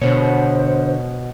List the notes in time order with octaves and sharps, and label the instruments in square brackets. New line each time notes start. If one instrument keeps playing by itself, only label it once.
[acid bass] B2 [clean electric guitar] D3 C#5 [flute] C5